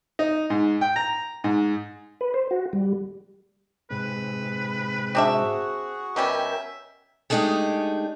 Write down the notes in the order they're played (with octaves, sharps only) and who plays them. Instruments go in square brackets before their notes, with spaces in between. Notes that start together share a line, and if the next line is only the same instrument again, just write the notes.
[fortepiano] D#4
G#2
G5
A#5
G#2
[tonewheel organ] B4
C5
F#4
G3
[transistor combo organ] G#2 C3 [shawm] B4
[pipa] C4 D4 E5 [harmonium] F#4 G#4
[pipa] B2 G3 C#4 [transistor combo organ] A#4 G5 [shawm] E5
[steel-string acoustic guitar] G#3 A3 D4 D#4 G4 G#4